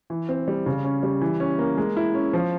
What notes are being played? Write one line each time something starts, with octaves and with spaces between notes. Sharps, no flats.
E3
C4
G3
C#3
C#4
G3
E3
C#4
A#3
G#3
E4
C#4
F3